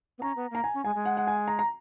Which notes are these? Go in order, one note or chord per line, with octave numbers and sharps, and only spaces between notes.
B3
C#4 A#5
B3
A#3 A#5
G#5
C#4
G#3 G#5
G#3
F#5
F#5
G#5
A#5
A#5